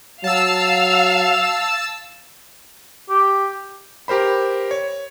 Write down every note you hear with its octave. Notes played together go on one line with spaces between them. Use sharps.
F#3 F5 A5 E6
G4
G4 A#4 C5 B5
C#5